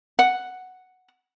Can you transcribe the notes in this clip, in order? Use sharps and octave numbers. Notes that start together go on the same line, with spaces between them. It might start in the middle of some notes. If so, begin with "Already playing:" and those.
F#5